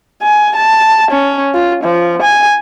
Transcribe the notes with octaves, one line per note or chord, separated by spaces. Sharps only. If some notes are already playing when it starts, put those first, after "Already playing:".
G#5
A5
C#4
F4
F3
G#5